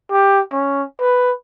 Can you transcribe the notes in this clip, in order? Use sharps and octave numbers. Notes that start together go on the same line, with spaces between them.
G4
C#4
B4